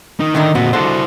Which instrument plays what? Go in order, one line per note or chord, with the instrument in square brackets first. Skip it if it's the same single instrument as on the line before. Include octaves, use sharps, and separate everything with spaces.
[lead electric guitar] D#3 D#4
[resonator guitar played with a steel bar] A2 D3 D#4 [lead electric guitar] D#3
[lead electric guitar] A#2 C4 [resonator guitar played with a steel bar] B3 F#4
[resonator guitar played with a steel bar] D3 F#4 A4 [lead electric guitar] E4 C5